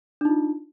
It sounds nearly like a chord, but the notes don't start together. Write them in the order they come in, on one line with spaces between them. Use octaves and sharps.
D4 D#4 F4